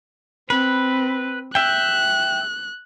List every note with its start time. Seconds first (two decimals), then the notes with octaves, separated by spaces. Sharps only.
0.50 C4 B4
1.55 E5 G5 F#6